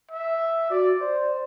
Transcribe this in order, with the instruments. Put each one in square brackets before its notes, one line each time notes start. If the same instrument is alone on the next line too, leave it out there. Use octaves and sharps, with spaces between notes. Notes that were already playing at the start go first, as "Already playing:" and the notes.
[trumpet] E5
[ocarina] F#4 [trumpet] D5
[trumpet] C5 [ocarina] D5